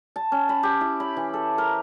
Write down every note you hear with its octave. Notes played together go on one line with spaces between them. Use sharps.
A5
C#4
B5
G4
E4
B5
E3
A4
A#4